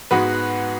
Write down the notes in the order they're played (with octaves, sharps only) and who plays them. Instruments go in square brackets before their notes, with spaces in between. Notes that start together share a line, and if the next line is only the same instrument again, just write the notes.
[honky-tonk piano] G#2 G#3 B3 F#4 B4